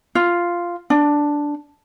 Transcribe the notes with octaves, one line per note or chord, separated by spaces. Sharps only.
F4
D4